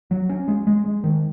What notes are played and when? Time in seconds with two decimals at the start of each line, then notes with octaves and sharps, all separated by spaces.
0.11 F#3
0.29 C#4
0.48 G#3
0.67 G#3
0.85 G#3
1.04 D#3